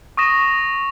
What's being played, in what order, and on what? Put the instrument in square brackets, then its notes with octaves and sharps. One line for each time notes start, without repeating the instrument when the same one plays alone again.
[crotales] C#6 D#6 A#6 E7